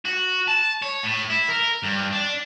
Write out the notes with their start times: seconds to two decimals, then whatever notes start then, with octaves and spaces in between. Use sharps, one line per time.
0.05 F#4
0.48 A5
0.82 C#5
1.03 A2
1.30 E4
1.48 A#4
1.83 G2
2.13 D4